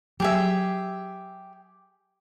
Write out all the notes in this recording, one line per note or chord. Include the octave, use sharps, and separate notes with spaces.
F#3 G4 G#4 E5